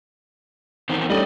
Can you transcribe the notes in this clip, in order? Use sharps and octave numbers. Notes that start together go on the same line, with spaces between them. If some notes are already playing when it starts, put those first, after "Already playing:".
E2 D#3 C4
G3 A3 C#4 D5 D#5